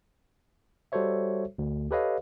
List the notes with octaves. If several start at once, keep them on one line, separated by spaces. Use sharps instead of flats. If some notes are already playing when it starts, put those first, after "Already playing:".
G3 F#4 A4 C5 C#5 E5
D2
G4 A4 B4 C#5 D#5 F5